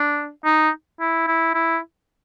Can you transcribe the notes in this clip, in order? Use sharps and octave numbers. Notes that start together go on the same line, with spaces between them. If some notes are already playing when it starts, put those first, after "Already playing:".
Already playing: D4
D#4
E4
E4
E4